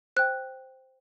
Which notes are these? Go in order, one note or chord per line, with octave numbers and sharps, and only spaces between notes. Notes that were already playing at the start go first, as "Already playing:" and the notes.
C5 G5 F#6